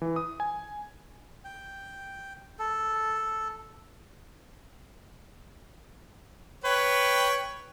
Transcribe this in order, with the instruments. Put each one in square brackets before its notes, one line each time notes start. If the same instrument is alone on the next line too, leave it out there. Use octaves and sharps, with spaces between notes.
[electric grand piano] E3
D#6
G#5
[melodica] G5
A4
[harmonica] B4 C#5 G5